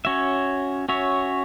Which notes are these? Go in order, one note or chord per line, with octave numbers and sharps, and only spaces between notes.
C#4 F#4 C#5 E5
C#4 F#4 C#5 E5